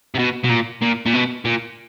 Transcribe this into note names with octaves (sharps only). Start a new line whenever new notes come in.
C3
B2
B2
A#2
A#2
A#2
B2
A#2